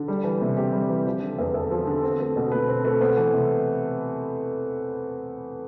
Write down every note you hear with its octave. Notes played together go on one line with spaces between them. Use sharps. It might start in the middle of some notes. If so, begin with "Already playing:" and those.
Already playing: D3
G3
E3
C3
C3 G4
G3
E3
F3
D3
E2
E2 A4
F3
D3
C4
A3
B2
B2 B4
C4
A3
B3 C5
E3
C3